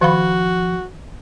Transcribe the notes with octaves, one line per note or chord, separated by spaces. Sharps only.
D#3 F3 F#4 F5 B5